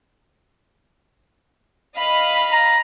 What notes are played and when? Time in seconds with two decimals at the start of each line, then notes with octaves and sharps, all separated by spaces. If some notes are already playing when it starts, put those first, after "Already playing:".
1.97 D#5 F5 B5
2.52 A#5